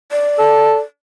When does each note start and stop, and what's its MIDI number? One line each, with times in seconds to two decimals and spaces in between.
0.12 0.79 74
0.38 0.79 69